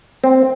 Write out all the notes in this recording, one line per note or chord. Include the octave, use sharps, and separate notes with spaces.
C4